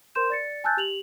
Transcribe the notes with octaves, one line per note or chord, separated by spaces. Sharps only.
A#4 C5 C6 G6 E7
D5 A6 C#7
G#5 A5 E6 F#6 G6 A6
G4 F7 F#7